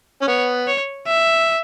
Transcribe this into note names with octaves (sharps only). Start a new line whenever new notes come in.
C#4
B3 C#5
C#5
E5